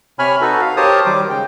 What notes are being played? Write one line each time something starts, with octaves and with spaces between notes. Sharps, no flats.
C3 C#5 G#5 B5 F6
D#4 F#4 A4 B4
F5
G4 A#4 C5 C#5 A5 D#6
D#3 F#3 G3 C5 D6
C#3 G#3 G5